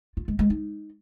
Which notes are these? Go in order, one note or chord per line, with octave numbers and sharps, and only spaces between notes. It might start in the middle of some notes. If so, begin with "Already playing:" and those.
F4
G#3
G#3
D#4